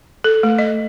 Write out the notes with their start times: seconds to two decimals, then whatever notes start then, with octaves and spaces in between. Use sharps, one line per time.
0.24 A4
0.43 A3
0.59 D#5